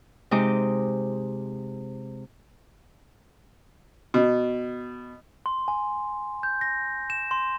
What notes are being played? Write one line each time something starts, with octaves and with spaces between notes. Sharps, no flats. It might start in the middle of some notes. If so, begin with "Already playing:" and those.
C3 G#3 D#4 D#5 D6
B2
C6
G#5
G6
A#6
E7
C6